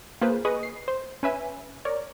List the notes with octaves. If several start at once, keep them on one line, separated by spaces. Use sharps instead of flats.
A#3 F4 G#4 B4 C5
G#4 B4 D#5 C#6 D#6
C7
C5
C#4 B4 E5 G#5
A#4 C#5 D5